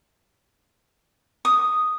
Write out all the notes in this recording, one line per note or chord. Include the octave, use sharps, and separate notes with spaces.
D#6